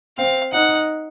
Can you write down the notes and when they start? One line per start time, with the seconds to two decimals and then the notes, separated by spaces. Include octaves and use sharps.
0.18 C4 F5
0.53 D#4 F#5